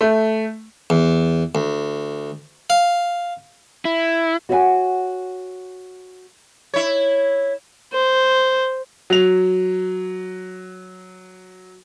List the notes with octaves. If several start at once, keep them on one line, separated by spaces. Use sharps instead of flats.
A3
E2
D2
F5
E4
F#4 C#5 D5 E5 F#5 G#5
E4 C#5
C5
F#3 F7